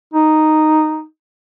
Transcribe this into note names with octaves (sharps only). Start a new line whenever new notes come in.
D#4